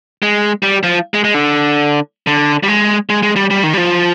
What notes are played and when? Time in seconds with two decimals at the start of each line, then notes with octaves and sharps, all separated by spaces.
0.22 G#3
0.63 G3
0.83 F3
1.14 G#3
1.24 G#3
1.34 D3
2.27 D3
2.63 G3
2.68 G#3
3.09 G#3
3.23 G#3
3.36 G3
3.50 G3
3.63 D#3
3.74 G3
3.77 F3